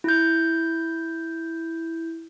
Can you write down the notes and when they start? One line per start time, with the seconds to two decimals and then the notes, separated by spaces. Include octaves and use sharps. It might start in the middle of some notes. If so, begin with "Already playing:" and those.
0.04 E4 G6